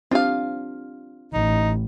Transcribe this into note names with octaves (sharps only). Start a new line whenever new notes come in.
C4 D4 F4 G4 F5
A1 D#4